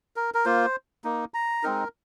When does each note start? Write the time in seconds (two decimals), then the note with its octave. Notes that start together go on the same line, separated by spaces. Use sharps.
0.16 A#4
0.34 A#4
0.45 A#3 F4 C5
1.04 A#3 D#4
1.34 A#5
1.63 G#3 C4 D#4 A#4